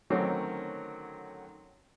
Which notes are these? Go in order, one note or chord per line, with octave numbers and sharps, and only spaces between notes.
D3 D#3 F#3 A3 C4 C#4